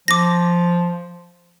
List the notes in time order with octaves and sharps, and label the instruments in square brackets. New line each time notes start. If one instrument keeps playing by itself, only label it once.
[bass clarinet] F3 [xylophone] D6 A#6